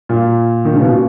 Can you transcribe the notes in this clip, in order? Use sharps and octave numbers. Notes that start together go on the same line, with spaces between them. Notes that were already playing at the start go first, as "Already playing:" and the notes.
A#2
D#3
C#3
B2
A#2